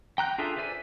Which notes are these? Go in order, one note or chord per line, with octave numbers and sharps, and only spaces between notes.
G5 A#5 F#6 G6
D4 F4 G#4 A4 E5
B4 C5 D5 E5 G#5